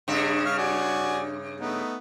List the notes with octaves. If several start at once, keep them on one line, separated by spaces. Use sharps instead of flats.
G2 C#3 E5
F5 C#6 F6
F#4 D5 G#5
A3 B3 D#4